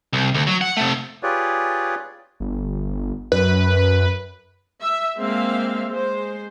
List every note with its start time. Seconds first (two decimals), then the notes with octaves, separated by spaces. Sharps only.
0.13 C2
0.34 D2
0.47 F#3
0.61 F#5
0.77 C3 A3
1.23 F4 G4 G#4 B4 C#5 D5
2.40 G1
3.32 F#2 B4
4.81 E5
5.17 G#3 A#3 C4 E5 F5
5.89 G#3 C5